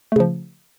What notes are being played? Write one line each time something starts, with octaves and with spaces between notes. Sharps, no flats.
C#3 F3 A3